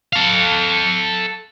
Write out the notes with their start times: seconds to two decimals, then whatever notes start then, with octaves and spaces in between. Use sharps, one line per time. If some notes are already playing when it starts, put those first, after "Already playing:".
0.13 A4 F5